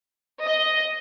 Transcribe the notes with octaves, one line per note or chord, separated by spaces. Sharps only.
D#5